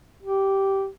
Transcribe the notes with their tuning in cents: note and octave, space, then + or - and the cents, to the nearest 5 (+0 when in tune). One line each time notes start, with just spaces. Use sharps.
G4 -10